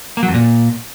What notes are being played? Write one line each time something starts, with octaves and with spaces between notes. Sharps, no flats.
A#3
F#3
F2
A#2